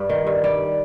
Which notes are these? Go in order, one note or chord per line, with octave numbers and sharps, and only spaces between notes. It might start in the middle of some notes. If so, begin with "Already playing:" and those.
Already playing: G2 G3
D#3
G2
G3